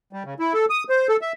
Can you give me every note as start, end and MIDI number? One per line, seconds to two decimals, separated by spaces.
0.13 0.23 55
0.25 0.34 49
0.39 0.53 64
0.54 0.65 69
0.70 0.84 87
0.89 1.07 72
1.09 1.17 69
1.21 1.33 76